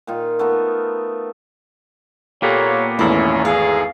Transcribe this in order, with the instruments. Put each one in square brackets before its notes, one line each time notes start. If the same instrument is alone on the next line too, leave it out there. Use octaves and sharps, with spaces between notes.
[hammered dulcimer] A#2 D#3 D#4 F4
A3 B3 D#4 A#4
[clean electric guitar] A#2 A#3 B3 [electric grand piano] G4 A4 [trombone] C#5
[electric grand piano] G#1 E2 A3 [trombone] C#4 [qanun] E4
[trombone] G#4 [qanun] F5